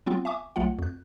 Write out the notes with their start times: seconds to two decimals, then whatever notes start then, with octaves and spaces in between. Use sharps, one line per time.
0.06 F#3 B3 C4 F4
0.25 E5 G#5 C#6 D6
0.56 B1 F#3 A3 F4 F#5
0.79 F2 F#6